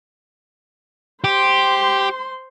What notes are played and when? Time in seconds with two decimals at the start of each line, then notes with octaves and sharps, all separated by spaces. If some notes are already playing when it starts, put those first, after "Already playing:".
1.24 G4 C5 C6